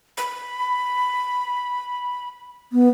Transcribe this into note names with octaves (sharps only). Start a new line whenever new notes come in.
B5
B3